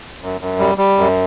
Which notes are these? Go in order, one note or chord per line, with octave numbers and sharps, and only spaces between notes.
F#2
F#2
G3
G3
F#2